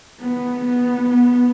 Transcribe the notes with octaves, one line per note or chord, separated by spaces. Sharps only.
B3
B3
B3